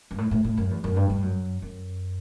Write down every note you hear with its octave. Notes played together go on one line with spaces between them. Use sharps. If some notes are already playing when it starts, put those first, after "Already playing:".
G2
A2
A2
A2
F#2
E2
F#2
G2
G2
F#2
F#2